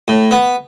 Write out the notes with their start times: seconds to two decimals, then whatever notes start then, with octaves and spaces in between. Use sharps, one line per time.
0.08 A2
0.31 B3